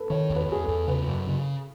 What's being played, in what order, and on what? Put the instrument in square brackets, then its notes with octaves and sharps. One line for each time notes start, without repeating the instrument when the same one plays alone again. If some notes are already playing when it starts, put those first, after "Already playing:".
Already playing: [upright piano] A4 B4
[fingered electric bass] D#3 [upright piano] C#5
[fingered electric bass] E2
[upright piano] B4
[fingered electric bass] E2 [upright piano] G#4
[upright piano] A4
[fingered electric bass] E2
[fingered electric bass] C#3 [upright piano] B4
[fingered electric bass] F#2
C#3